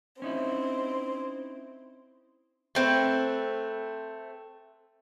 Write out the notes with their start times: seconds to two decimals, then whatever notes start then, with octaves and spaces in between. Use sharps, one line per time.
0.22 C4 C#4 D#4 E4
2.75 A3 C4 B4